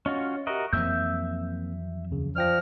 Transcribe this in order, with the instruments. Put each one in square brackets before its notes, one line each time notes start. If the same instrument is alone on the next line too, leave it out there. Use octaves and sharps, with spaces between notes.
[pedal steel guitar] C#4 F4 F#4 [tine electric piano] D#5
[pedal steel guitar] F#4 A#4 D#5 [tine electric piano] G4 E5
[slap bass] F2 E3 F#3 [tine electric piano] A#3 C4 [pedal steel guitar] E5 E6 G6
[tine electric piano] D#2 C#3
[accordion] F3 F6 [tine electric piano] D5 G5 A#6